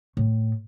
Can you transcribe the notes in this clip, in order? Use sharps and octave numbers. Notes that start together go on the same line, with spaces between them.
A2